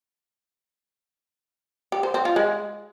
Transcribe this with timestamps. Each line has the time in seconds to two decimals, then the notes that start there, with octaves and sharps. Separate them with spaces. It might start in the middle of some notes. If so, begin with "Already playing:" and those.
1.92 G4
2.03 C5
2.14 C4
2.25 F4
2.36 G#3